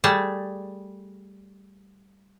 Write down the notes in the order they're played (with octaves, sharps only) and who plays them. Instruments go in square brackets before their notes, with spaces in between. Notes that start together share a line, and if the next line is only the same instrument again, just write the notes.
[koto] G3 A3 G#4 A5